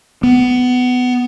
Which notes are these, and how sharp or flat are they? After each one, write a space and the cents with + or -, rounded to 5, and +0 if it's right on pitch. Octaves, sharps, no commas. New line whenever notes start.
B3 +15